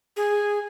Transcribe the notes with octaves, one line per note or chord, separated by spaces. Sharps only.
G#4